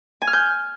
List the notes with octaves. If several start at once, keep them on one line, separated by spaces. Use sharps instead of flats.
G#5
F6
G6